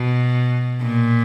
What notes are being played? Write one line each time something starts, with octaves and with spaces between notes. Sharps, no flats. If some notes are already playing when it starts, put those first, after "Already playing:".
Already playing: B2
A#2